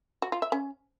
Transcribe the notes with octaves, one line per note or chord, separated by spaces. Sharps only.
F#4
F4
E5
C#4